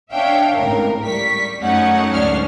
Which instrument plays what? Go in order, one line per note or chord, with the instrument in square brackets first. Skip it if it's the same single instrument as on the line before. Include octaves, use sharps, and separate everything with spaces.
[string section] D4 C#5 E5 F5 G5
G#1 C#2 A2 A#4
G3 C#6 B6
F#2 A3 C#4 D#4 F#5
D2 G#2 C#4 D4 F6 C7